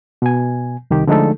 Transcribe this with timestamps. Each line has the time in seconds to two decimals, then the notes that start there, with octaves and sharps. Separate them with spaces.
0.22 B2 G#5
0.91 C2 D#3 G4
1.07 D3 F3 G#3 A3 D#4 A4